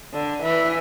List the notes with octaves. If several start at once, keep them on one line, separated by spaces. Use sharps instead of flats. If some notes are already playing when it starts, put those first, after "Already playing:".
D3
E3